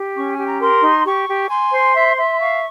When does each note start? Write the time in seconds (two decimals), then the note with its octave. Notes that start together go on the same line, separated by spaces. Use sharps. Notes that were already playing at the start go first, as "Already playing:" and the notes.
Already playing: G4
0.16 C#4 C#6
0.31 G#5
0.38 G4
0.47 A#5
0.61 A#4 C6
0.83 D#4
1.06 G4 C#6
1.28 G4
1.49 G#5 C6
1.72 C5
1.95 E5
2.17 E5
2.40 F5 C#6